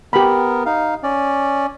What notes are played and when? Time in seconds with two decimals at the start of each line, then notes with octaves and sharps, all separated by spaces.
0.13 B3 G4 A#4 B5
0.66 D#4 F5
1.03 C#4 D5